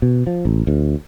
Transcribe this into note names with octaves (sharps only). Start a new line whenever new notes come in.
B2
F3
A1
D2